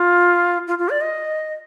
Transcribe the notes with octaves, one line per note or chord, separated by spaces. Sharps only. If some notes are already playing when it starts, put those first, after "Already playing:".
Already playing: F4
F4
F4
D5
D#5